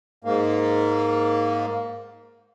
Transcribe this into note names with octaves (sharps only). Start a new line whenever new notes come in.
G#2 A#3